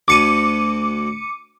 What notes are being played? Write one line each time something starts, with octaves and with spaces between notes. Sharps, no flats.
D2 A5 D6 C#7 D#7